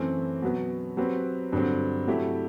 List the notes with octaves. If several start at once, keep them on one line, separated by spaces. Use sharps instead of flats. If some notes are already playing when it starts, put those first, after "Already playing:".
Already playing: F#2 E3 A3 C4
B2 F#3 B3
F#3 C4 G4 B4
G2 D3 F#3 C4
C3 F#3 A3 E4 G4